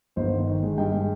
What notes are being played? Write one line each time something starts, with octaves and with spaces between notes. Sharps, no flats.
G1 C5 D#5
D#3
D#3
G#3
G2 D#5 G5
G#3